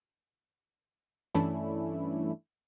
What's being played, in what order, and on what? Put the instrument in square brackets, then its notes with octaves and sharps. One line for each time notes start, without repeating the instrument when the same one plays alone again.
[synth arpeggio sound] G2 E3 A3 C#4 D4 E4